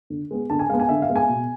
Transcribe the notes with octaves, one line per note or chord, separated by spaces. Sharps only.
D3
G#3 B3
D3 A5
G#5
G#3 B3 F5
G#5
D3 E5
F5
G#3 B3
G#5
B2